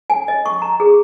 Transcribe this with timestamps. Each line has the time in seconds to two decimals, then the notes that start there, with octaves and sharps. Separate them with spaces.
0.10 G#5
0.28 D#5
0.46 C#6
0.62 A#5
0.80 G#4